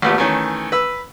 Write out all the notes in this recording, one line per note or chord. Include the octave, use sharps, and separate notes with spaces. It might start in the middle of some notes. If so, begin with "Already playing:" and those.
G#1 A#2 A3 B3 G4
D#3 E3 A3 C#4
B4 E6